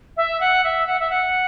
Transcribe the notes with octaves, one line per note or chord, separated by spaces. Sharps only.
E5
F#5
E5
F#5
E5
F#5